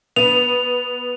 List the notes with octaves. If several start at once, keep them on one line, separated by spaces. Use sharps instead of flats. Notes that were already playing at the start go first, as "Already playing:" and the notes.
B3 D#7 F7